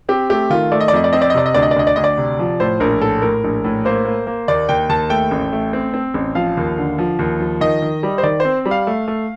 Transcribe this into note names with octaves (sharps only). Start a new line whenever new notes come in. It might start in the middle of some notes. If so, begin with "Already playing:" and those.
C4 G4
A3 G4
D#3 F4
A3 D5
D#5
D5
F2 D#5
D5
C4 D#5
D5
D#5
C3 D5
D#5
D2 D5
D#5
D5
D2 D#5
D5
D2 D#5
D5
C3
F3
A2 C5
A#1 A#4
A2 A4
A2 A#4
A#1
A2
A#3 C5
A#3
A#3
D#2 D5
D#2 G5
D#2 A5
A3 G5
A1
A3
C4
C4
A1
F3 F5
D#2
D3
F3
D#2
F3
D#3 D#5
D#3
G3
C5
D#3 D5
C4 C5
G3
F5
A3
A3